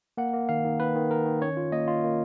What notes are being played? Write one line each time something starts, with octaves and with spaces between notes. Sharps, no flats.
A#3 F#5
A#3
D#3 F5
D#3
D#3 B4
D#3
D#3 A#4
D#3
C#4 C#5
F4
A#3 D#5
F4
A#3